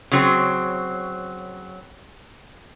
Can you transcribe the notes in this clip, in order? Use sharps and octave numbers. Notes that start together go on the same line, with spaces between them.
C#3 F#3 C4